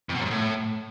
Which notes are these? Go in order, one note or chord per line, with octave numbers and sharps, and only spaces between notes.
F2
B2
F#2
G#2
A2